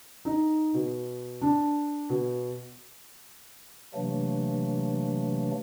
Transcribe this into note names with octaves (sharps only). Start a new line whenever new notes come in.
D#4
B2
D4
B2
C3 E3 F#3 A3 A#3 D4